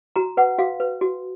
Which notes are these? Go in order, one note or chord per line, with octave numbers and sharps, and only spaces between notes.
F#4 A#5
B4 F#5
F#4 F5
B4
F#4